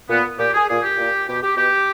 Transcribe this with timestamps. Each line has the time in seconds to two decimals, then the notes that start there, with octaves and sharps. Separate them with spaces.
0.09 A#2 B3
0.38 A#2 G4
0.53 G#4
0.68 A#2 G#4
0.83 G4
0.97 A#2
1.26 B2 G4
1.41 G4
1.56 B2 G4